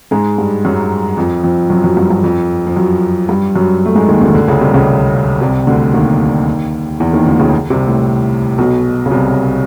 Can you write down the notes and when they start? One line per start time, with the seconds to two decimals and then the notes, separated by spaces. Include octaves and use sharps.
0.11 G#2 G#3
0.38 G2 G3
0.65 F#2 F#3
1.17 F2 F3
1.44 F2 F3
1.70 F#2 F#3
1.84 F#2 F#3
1.97 G2 G3
2.10 G2 G3
2.24 F2 F3
2.67 F3
2.76 F#2 F#3
3.29 G2 G3
3.56 F#2 F#3
3.85 A3
3.95 G#2 G#3
4.08 D#2 D#3
4.21 D2 D3
4.34 D2 D3
4.48 C#2 C#3
4.61 C2 C3
4.74 C#2 C#3
5.41 C2 C3
5.67 D2 D3
5.94 D#2 D#3
7.00 E2 E3
7.13 D#2 D#3
7.26 D2 D3
7.39 C#2 C#3
7.70 C2 C3
7.88 A2
8.58 B1 B2
9.06 C#3
9.11 C2 C3